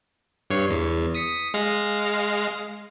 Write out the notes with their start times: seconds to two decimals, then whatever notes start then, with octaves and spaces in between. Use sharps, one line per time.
0.50 G2 C#5 C7
0.70 E2
1.15 D#6 B6 C#7
1.54 G#3 F5 A#6